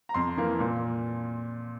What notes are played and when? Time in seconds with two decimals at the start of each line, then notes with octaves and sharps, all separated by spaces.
0.09 A#5
0.14 F2 C6
0.37 E3 A#3
0.60 A#2